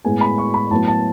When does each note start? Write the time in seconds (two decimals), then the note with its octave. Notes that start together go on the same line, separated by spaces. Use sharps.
0.05 A2 G#3 B3 G#5
0.21 B5
0.38 C#6
0.54 B5
0.71 A2 F#3 B3 A5
0.88 A5